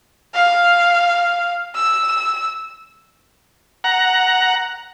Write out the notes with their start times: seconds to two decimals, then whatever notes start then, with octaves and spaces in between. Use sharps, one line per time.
0.34 F5
1.75 E6
3.84 F#5 A#5